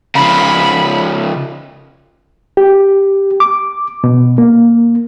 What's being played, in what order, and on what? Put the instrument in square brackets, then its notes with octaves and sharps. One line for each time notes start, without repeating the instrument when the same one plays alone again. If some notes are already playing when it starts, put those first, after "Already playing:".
[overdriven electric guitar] C#3 F3 [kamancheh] B5
[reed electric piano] G4
D6
B2
A#3